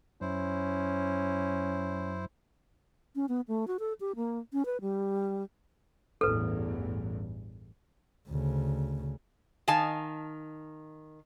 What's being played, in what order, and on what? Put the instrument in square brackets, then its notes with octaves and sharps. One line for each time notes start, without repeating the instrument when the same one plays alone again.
[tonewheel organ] F#2 [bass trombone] C#4 [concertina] E4 C5
[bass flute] C#4
B3
A3
F#4
A4
G4
A#3
C#4
B4
G3
[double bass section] A1 E2 G2 [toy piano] A4 B4
[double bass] D2 C#3
[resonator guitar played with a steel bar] D#3 F5 G#5 A5